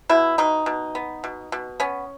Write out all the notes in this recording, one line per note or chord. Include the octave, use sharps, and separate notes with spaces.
B2 E4
B2 D#4
B2
B3
B2
B2
B3 C#4